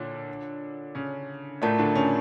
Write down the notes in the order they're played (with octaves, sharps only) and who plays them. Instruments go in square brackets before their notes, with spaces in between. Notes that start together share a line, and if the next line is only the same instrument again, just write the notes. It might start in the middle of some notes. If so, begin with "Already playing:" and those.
Already playing: [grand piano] A#2 D3 D4 [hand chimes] F4 C#5
[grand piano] C#3 C#4
[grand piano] A2 A3 [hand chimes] F4 A#4 D5 A5
[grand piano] D3 D4
C#3 C#4